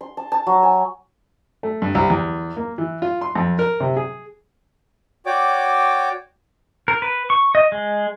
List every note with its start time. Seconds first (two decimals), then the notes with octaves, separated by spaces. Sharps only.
0.01 C6
0.17 A5
0.32 A5
0.47 F#3
0.63 G#5
1.63 A3
1.82 G2
1.95 C2
2.10 E2
2.57 A#3
2.78 E3
3.02 F4
3.21 C6
3.35 F2
3.59 A#4
3.80 C3
3.97 G#4
5.26 F#4 C#5 D5 G5 D6
6.88 A#4
7.02 B4
7.30 C#6
7.55 D#5
7.72 G#3